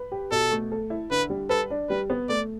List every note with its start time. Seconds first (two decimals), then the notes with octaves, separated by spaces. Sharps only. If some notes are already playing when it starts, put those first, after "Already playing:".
Already playing: B4
0.12 G4
0.31 B2 A4
0.51 A3
0.72 A4
0.90 E4
1.11 D3 B4
1.30 G3
1.49 A4 B4
1.70 D4
1.89 G3 B4
2.10 B3
2.29 A3 D5